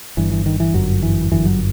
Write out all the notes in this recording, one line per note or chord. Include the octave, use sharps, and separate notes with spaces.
G1 G2 E3
E3
D#3
E3
G1 F#2 F#3
E3
G1 F#2 E3
F#3